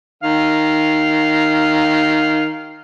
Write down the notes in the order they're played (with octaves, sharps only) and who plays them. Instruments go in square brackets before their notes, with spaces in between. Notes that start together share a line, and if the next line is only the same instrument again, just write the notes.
[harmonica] D#3 F5